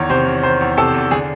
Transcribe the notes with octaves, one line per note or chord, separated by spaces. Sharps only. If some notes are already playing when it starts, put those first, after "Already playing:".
Already playing: E2 D#3 C#5
C3 C5
E2
D#3 C5
E2
C3 A4
E2
D3 G#4